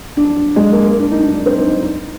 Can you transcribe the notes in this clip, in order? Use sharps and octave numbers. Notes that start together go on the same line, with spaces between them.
D4
G#3
A#3
A#3
D4
D#4
D4
D4
C4
D#4
D#4
D#4